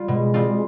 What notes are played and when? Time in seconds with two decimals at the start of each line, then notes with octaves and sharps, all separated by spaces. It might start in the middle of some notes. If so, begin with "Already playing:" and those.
Already playing: G3 F4
0.08 B2 G#3
0.34 G3 C4 F4